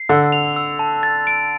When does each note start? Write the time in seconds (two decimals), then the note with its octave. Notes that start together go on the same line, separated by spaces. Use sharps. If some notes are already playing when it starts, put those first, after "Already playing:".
Already playing: C7
0.09 D3 E6
0.32 F7
0.56 E6
0.79 A5
1.03 A6
1.27 D7